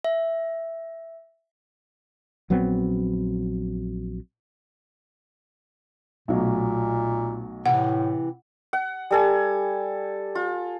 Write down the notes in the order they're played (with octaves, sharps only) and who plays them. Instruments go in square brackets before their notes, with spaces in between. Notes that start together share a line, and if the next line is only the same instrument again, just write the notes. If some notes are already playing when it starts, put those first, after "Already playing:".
[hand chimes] E5
[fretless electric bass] A#1 F#3 B3 C4
[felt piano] B1 F#3 A3 [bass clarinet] A#2
[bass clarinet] A2 [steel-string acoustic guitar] C3 E3 [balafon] F#5
[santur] F#5
G3 A4 G#5
F4